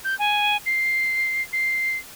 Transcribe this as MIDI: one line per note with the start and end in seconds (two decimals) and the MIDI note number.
0.04 0.17 91
0.19 0.57 80
0.66 1.42 96
1.53 1.97 96